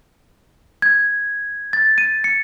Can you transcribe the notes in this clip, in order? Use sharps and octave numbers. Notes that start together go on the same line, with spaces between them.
G#6
A6
D#7
C#7